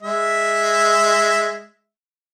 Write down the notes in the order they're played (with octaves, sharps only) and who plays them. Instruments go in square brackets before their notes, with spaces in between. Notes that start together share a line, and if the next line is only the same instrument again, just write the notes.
[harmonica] G#3 E5